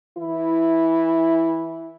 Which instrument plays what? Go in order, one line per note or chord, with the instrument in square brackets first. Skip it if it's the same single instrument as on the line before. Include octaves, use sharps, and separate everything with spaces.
[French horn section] E3 E4